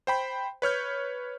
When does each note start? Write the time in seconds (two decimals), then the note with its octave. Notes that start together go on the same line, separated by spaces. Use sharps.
0.07 C5 G5 B5
0.62 B4 C#5 F6 G6